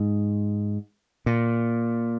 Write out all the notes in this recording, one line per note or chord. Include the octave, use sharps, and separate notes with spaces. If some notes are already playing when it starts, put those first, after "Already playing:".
Already playing: G#2
A#2